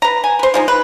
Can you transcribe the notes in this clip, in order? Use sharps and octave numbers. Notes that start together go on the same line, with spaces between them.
B4 A#5
G#5
B4 C5
F3 G#3 D#4
B4